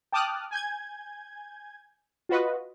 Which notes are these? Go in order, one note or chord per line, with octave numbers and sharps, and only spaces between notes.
G5 A5 D6 D#6 F6 F#6
G#5 G6 G#6
F4 F#4 B4 D#5